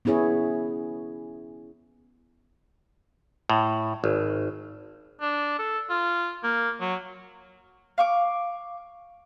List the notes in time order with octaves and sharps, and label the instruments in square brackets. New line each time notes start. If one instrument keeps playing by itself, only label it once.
[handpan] B3 C#4 E4 G#4 C#5
[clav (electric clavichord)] A2
G#1
[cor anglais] D4
A4
F4
A#3
F#3
[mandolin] F5 C#6 D6